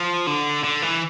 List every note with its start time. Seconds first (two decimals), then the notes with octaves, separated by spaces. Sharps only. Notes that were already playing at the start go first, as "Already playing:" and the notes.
Already playing: F3
0.27 D3
0.64 D3
0.82 E3